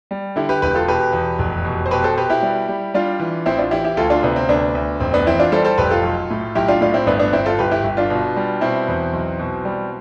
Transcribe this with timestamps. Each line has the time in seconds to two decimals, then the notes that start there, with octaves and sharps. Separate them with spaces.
0.11 G3
0.36 D3 E4 G4
0.49 G4 B4
0.62 E1 G4 B4
0.75 F4 A4
0.88 B2 G4 B4
1.13 E2
1.39 F1
1.65 B2
1.86 C5
1.91 B2 G4 B4
2.04 A4 C5
2.17 B2 G4 B4
2.30 E4 G4
2.42 G3
2.68 G3
2.94 G3 D4 F4
3.20 E3
3.46 A1 C4 E4
3.58 D4 F4
3.71 E3 E4 G4
3.84 E4 G4
3.97 D2 F4 A4
4.10 D4 F4
4.23 C3 B3 D4
4.36 C4
4.49 D2 B3 D4
4.75 D2
5.00 F1 C4
5.13 B3 D4
5.27 E3 C4 E4
5.39 D4 F4
5.52 G3 A4 C5
5.65 A4 C5
5.78 F1 G4 B4
5.91 F4 A4
6.03 B1
6.30 A2
6.55 B1 E4 G4
6.68 D4 F4
6.81 A2 D4 F4
6.94 C4 E4
7.07 G1 B3 D4
7.19 B3 D4
7.33 G1 C4 E4
7.46 F4 A4
7.59 G1 G4 B4
7.71 E4 G4
7.84 G1
7.97 D4 F4
8.10 B2
8.36 G3
8.61 B2 C4 E4
8.88 E2
9.13 B1
9.40 B2
9.65 G3